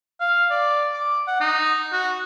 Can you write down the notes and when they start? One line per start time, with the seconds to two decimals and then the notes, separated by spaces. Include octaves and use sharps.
0.20 F5
0.51 D5
0.94 D6
1.27 F#5
1.40 D#4
1.92 F#4